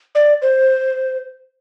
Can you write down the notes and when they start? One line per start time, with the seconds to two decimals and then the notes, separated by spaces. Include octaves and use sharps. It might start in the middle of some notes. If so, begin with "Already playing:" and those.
0.15 D5
0.42 C5